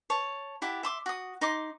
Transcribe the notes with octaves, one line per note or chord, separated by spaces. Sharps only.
C#5 A5
E4 G4 F#5 A5
E5 C6 D6
F#4 D#6
D#4 D#5 C6 D6